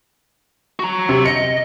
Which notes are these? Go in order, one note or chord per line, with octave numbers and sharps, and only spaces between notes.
F#4 A#5
C3
D#5 C#7